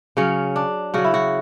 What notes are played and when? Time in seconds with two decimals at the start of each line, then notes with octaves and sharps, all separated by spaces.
0.17 C#3 F#3 C#4
0.56 D4
0.94 C#3 F#3 F#4
1.04 E4
1.14 F#4